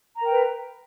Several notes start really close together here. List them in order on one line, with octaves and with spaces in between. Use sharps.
A#5 A#4 G5 B4